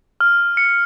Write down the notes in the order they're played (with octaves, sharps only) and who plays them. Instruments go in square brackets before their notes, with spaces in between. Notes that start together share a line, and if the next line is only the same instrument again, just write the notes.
[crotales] F6
C#7